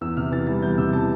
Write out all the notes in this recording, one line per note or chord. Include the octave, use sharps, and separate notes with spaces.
E2 E6
C3 F6
E3 A6
G3 A6
E2 G6
C3 E6
E3 A5